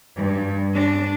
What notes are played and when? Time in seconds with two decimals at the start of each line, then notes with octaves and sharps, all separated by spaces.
0.15 G2
0.75 D4